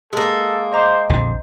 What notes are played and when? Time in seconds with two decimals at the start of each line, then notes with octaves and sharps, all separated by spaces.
0.13 G#3 A#3 A4
0.73 C5 D#5 A#5 D6
1.09 A#1 F2 D3 C5